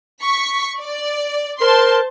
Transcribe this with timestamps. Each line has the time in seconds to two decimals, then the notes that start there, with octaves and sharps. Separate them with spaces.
0.23 C#6 B6
0.79 D5
1.60 A#4 C5 A5 C6